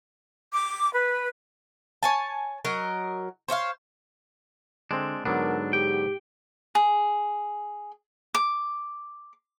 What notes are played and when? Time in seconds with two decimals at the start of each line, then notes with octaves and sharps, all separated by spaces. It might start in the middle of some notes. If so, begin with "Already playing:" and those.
0.52 D6
0.93 B4
2.03 C#5 G#5 A5
2.65 F#3 A#4 D#5
3.48 C5 C#5 E5 F5
4.91 D3 G#3 C4 D4
5.25 G#2 D3 F#3 B3 D4 A#4
5.73 G4 G5
6.75 G#4
8.35 D6